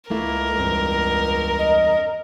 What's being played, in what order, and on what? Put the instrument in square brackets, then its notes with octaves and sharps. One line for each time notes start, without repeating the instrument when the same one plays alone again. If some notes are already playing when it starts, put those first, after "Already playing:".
[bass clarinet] C#2 [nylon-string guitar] A3 A#3 E4 [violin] A#4
[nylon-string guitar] E2 G2 C4
[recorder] D#5